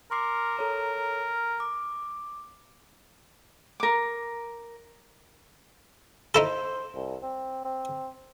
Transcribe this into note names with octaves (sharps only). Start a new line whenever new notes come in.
A#4 C6 D6 C7
A4 C#5 A#5
D6
A#4 D6
D#4 E4 A4 C5
C2
C4
C4